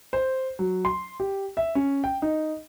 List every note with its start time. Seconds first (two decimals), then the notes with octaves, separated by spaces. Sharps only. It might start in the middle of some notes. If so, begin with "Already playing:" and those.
0.13 C5
0.59 F#3
0.85 C6
1.20 G4
1.57 E5
1.75 C#4
2.04 G5
2.22 D#4